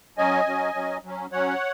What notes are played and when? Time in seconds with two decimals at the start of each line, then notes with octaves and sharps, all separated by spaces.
0.18 F#3 C#4 D#5 G#5
0.47 F#3 C#4
0.75 F#3 C#4
1.04 F#3 C#4
1.32 F#3 C#4 C#5 F#5